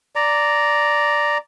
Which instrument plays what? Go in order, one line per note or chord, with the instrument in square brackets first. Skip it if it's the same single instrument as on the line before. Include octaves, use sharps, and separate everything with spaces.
[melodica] D5 A#5